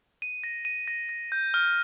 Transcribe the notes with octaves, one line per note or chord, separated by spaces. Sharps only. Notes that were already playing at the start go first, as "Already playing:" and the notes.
D#7
A#6
D#7
A#6
A#6
G6
F6